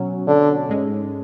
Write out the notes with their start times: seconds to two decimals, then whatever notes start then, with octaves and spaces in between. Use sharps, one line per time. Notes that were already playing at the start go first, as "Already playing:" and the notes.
Already playing: B2 F#3 C#4
0.27 D3
0.69 G#2 G#3 C#4